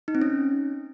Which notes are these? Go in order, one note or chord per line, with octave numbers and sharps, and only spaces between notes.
D#4
C4
C#4